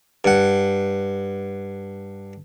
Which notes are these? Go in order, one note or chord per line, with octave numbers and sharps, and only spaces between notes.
G2 F#5